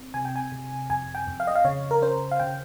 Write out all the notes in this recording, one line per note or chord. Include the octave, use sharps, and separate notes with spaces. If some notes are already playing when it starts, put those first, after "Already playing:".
Already playing: C4
C3 G#5
G5
G#5
C3
F2 G#5
G5
F2
F5
D#5
F5
C#3 C#5
A#4
C#4 C5
F5
C#3 G5